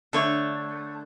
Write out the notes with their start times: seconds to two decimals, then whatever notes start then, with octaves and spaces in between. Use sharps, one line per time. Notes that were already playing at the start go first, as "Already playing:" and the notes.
0.13 D3 A3 A4 C#5